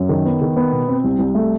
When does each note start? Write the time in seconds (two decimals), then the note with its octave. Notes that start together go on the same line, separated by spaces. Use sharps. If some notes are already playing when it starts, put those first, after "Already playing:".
Already playing: F#2
0.09 D#3
0.25 B3
0.41 D#3
0.56 B3
0.72 B2
0.88 C4
1.04 C2
1.19 C2
1.35 A3